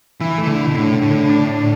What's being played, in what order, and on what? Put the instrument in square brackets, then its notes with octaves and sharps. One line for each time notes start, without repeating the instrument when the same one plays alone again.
[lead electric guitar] E3 [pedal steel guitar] E4
[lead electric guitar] E3 [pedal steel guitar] A3
[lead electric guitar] D3
[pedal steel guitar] E4
[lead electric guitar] B2
[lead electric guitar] A2 [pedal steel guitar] D3
[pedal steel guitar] D3
[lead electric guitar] A2
[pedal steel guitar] D3
D4
D4